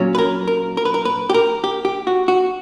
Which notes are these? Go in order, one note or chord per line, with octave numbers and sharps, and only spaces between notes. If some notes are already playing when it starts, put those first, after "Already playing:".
Already playing: A#2 F#3 C#4
B4
A#4
A#4
A#4
B4
A#4
B4
G4
A#4
G4
G4
F#4
F#4